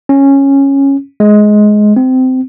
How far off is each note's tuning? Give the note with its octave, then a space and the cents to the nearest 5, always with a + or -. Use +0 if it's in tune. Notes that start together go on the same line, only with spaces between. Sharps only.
C#4 -10
G#3 +15
C4 -20